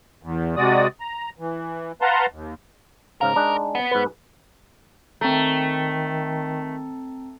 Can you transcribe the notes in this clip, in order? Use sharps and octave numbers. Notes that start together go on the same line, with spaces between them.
E2
C3 G#3 F#4 D5 D#6
A#5
E3
B4 F5 F#5 A5 A#5 C6
D#2
G#2 C#3 A#4 F5
G#3 D4 D#4
B3
G#2 B4
D#3 A3 C4 A#5